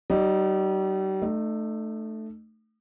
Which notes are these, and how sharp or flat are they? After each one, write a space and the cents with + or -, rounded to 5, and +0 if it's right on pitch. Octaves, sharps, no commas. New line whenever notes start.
G3 -40 D#4 -20
A3 +0 D#4 -40